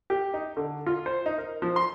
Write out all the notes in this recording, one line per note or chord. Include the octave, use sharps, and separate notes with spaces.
G4
D#4
D3
F4
C5
D#4
A#4
F3
C6